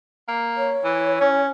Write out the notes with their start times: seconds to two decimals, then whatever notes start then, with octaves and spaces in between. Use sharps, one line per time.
0.28 A#3
0.57 C#5
0.84 E3
1.21 C#4